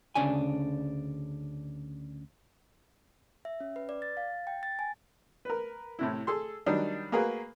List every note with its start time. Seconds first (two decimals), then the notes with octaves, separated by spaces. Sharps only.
0.15 D2 C#3 D4 G#5
3.45 E5
3.60 C#4
3.76 B4
3.89 D5
4.02 A6
4.17 F5
4.30 A6
4.47 G5
4.63 A6
4.79 G#5
5.45 A#4 B4
5.99 A2 C3 E4
6.27 G#4 A4 C6
6.66 D#3 F#3 G3 D4 D#4
7.12 A#3 F#4 G#4 A#4 B4